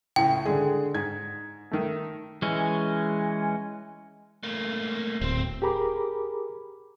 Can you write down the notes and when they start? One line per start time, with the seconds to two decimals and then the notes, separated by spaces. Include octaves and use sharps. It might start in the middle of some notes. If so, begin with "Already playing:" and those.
0.16 C#2 A2 G5
0.46 D3 G#3 G#4
0.94 G#2 G#6
1.71 D#3 A3
2.42 E3 G#3 C#4
4.43 A3 A#3
5.21 D1 C4
5.62 G4 G#4 A#4 A#5 B5 D6